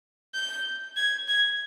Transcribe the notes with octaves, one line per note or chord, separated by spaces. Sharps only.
G6
G#6
G#6